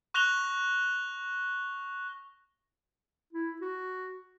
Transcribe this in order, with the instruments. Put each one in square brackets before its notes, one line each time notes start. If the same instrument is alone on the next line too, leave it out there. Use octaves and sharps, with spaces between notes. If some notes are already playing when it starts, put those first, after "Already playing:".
[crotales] C#6 F#6 A#6 F7 G7
[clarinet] E4
F#4